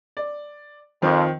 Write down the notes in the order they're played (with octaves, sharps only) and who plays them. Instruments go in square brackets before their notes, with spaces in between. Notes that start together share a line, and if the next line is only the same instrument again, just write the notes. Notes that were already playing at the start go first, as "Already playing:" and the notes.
[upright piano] D5
[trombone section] F2 [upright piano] D#3 F3 C4